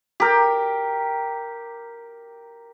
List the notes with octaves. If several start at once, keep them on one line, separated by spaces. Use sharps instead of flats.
G4 A#4